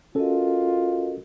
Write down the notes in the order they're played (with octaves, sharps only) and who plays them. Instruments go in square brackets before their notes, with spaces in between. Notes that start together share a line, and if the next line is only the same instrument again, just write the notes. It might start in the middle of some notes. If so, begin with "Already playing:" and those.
[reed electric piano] C#4 A4 [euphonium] F4 [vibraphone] F#4 A#4 D#5